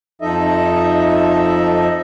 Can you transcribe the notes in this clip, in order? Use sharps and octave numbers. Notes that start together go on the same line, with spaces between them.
F2 F3 D#4 A4 D#5 E5